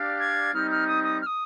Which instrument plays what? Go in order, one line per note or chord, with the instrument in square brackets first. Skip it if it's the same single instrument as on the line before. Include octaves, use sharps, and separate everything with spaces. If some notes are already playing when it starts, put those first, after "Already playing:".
Already playing: [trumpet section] D4 G4 D5 F5
[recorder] G#6
[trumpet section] G3 C4 D#4 [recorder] F6
[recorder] F6
D#6
D#6
F6
D#6